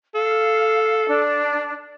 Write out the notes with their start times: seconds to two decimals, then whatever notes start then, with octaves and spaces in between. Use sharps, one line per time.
0.15 A4 F5
1.07 D4